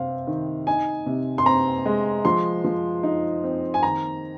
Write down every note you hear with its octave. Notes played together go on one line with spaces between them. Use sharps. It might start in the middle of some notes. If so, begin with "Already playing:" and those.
Already playing: C3 C4 F5
D#3
D#4 G#5
C3
C6
C4 A#5
G#3
F3 C6
F3
D#4
C4
G#5
D#3 A#5